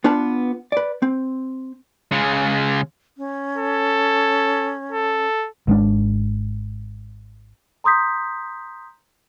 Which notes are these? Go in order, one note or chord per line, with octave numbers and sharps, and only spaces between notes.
B3 D4 F4 B4 A5
B4 D5
C4
C#3 G#3
C#4
A4
A4
G#1 G#3 D4
A#5 C6 D#6 G6 B6